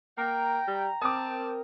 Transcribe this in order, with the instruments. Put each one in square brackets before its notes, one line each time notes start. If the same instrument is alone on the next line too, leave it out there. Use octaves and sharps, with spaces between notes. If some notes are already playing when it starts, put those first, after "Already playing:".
[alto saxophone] A#3 [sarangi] G5 [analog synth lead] A#5
[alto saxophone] G3
[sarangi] C4 [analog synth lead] A#4 [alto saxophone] A5 [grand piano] D6 D#6